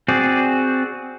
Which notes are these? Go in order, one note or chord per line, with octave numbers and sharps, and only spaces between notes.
C4 F#4 G#4 D5